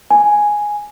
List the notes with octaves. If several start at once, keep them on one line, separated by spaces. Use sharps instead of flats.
G#5